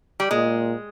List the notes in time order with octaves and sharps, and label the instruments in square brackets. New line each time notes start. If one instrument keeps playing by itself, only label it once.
[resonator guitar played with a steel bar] G3
[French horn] A#2 [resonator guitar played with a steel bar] G#3